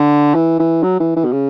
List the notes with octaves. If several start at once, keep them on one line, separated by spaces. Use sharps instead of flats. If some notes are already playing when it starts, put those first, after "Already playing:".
Already playing: D3
E3
E3
F#3
E3
E3
B2
C#3